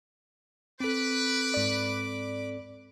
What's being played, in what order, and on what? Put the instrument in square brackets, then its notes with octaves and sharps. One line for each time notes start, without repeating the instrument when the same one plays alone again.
[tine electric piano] C4 A4 [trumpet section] B4 [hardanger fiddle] B5 D6
[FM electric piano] G#2 D5